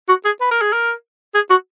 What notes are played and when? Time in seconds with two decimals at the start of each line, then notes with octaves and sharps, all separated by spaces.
0.09 F#4
0.25 G#4
0.41 B4
0.51 A#4
0.61 G#4
0.73 A#4
1.34 G#4
1.50 F#4